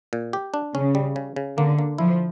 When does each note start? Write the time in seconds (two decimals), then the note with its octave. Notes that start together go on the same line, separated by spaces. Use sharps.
0.13 A#2
0.33 G4
0.54 D4
0.75 C#3 C#4
0.95 G3
1.16 C#3
1.36 C#3
1.57 D3 A#3
1.79 A#3
1.98 F3 E4